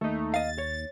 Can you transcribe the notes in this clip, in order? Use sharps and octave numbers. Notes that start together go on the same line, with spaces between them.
D#2 A3 D#4
D#5 F5 A6
C#5